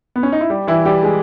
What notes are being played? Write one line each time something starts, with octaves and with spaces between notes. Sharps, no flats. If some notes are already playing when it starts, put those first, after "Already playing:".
B3
C#4
D#4
E4
G3 G4
E3 E4
G3 G4
G#3 G#4